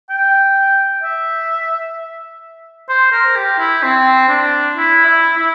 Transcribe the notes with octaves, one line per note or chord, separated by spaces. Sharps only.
G5
E5
C5
A#4
G4
E4
C4
D4
E4
E4
E4